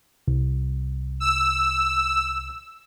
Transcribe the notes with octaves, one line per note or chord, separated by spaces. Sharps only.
C2
E6